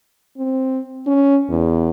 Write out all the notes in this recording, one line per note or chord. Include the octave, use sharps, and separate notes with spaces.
C4
C#4
E2